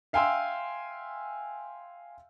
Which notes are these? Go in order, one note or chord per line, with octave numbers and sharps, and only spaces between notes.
E5 F5 G5 G#5 C6 E6